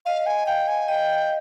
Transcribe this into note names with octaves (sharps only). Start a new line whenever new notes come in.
D#5 F5
G#5
F5 G5
G#5
D#5 G5